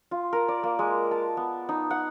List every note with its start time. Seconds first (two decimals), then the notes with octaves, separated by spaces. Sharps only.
0.11 F4
0.33 A#4
0.48 D5
0.63 A#3
0.79 G#3
1.11 A5
1.37 B3
1.69 D#4
1.90 F#5